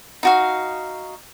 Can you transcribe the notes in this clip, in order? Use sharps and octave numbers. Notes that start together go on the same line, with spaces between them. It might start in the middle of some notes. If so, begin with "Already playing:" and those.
D#4 F#4 F5